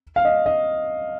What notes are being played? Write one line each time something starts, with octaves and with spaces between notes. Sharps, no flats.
F5
D#5
D#5